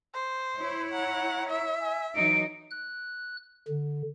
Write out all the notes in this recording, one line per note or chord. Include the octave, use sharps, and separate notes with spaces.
C5
E4 C#5
F#5 A#5
E5
G#5
E3 F#3 D#4 D7
F#6
D3